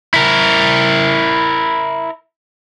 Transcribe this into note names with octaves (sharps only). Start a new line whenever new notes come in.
E4 A#4